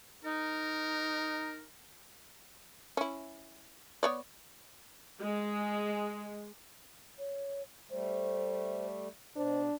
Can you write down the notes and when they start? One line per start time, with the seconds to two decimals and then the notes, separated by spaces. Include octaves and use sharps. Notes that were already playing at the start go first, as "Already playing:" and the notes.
0.24 D#4 A#4
2.97 C#4 E4
4.03 B3 C#5 D5
5.20 G#3
7.19 C#5
7.91 G3 A3 C5
9.36 B2 D4 C5